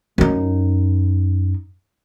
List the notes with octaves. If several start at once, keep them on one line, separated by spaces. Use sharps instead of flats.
F#2 D#4